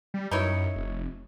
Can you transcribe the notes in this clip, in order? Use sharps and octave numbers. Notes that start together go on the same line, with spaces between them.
G3
F#2 D#4 E4 C#5
F1